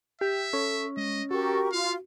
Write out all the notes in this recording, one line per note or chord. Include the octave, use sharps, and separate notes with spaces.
G4 E5
C#4 A4
G#3 D#5
F#4 G4 A4 A#4 C#6
F4 F5